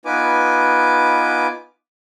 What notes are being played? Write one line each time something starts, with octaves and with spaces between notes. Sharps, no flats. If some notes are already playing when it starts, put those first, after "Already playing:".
B3 D#4 F4 B4 G#5 D6